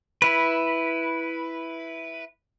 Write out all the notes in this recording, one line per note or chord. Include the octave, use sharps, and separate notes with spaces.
E4 B4